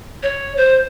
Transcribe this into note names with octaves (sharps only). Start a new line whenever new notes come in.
C#5
C5